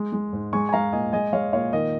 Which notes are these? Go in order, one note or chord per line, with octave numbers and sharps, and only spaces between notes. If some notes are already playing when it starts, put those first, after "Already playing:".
Already playing: G#3
G#3
G#2
G#3 G#5 C#6
G#5
G#3 F5 A#5
A#2 D#5 G#5
G#3 D#5 G#5
G#3 C#5 F5
A#2 C#5 F5
D#3 D#5